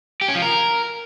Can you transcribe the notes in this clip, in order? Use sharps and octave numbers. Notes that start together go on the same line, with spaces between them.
G4
C#4
F3
A#4